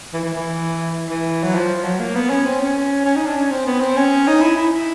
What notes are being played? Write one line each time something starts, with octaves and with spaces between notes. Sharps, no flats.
E3
E3
E3
E3
F#3
F3
F#3
A#3
B3
C#4
C4
C#4
C#4
D#4
D4
C#4
C4
B3
C4
C#4
D#4
E4
E4